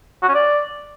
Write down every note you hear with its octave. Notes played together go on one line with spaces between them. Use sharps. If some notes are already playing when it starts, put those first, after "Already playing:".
F#4
C#4
D5